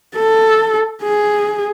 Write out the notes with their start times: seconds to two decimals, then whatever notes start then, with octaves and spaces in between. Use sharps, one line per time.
0.16 A4
1.03 G#4